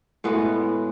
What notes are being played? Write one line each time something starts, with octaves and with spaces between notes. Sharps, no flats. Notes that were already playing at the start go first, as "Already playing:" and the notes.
A2 G#3 B3 F#4